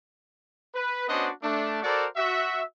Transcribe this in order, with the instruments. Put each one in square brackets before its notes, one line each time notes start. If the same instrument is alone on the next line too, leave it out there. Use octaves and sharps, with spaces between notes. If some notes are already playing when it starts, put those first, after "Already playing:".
[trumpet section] B4
B3 C#4 D4 F#4 C5 D#5
A3 D4
F#4 A4 A#4 C5 D5
F#4 E5